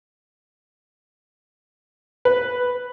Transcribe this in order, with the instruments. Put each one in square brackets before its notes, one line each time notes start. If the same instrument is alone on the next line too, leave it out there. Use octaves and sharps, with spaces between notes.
[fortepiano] B4